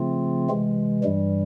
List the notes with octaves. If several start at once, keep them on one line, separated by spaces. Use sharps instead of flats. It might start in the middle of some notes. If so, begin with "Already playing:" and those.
Already playing: C#3 F3 A3 C4 F4
C3 E3 G#3
G2 E3 G3